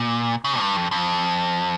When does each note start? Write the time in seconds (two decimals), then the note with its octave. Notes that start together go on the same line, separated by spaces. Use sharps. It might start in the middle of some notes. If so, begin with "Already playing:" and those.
Already playing: A#2
0.44 C#3
0.60 G2
0.76 F2
0.91 F2